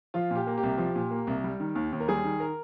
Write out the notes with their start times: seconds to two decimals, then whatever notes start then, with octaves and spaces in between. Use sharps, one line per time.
0.14 F3 F4
0.30 A#2 G4
0.47 A#3
0.58 G4
0.63 C2
0.78 F3
0.95 A#2
1.11 A#3
1.27 C2
1.44 G3
1.60 D#3
1.75 D#2
1.92 D#2
2.00 A#4
2.08 G3 G#4
2.24 D#3
2.40 A#4